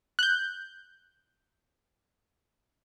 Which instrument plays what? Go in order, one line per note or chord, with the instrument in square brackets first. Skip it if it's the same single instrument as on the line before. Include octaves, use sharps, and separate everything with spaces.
[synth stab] F#6 G6